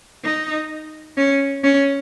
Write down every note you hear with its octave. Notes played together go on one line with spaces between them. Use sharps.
D#4
C#4
C#4